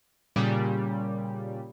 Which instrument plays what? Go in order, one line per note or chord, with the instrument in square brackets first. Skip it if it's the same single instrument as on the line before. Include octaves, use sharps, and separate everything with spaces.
[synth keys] A#2 C#3 G3